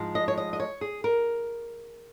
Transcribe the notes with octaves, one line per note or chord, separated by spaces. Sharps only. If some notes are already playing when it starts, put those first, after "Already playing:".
Already playing: G#2 F3 G#3
D#5
C#5
D#5
D#5
C#5
G#4
A#4